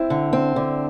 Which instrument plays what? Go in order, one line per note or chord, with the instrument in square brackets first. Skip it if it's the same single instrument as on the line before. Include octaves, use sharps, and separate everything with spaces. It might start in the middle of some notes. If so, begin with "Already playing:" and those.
Already playing: [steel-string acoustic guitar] C4 [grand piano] E4
[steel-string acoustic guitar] D3
C4
D3